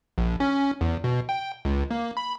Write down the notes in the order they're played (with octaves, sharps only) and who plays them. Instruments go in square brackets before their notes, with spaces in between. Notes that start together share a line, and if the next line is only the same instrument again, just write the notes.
[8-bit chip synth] A#1
C#4
E2
B2
G5
C#2
A#3
B5